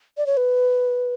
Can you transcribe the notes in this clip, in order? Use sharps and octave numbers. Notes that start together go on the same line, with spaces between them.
D5
C#5
B4